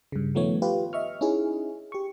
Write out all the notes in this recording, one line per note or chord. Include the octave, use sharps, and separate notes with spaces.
G2 C#3
D#3 F3 A3 B3 C#5
F4 G4 B4
D#5 E5 C#6 F6
C#4 D#4 E4 G#4
G4 C#6